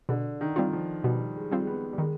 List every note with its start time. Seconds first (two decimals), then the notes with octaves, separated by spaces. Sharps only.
0.09 B2 D3
0.41 D#3
0.56 G3 C4 F4
0.73 F3
1.03 B2 G3
1.36 G#3
1.51 G3 C4 F4
1.60 G#3
1.67 B3
1.93 G3
1.98 D#3 G#3